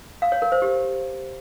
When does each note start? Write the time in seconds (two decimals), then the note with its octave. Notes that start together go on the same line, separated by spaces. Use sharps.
0.22 F5
0.32 C#5
0.42 A#4
0.52 C5
0.62 G4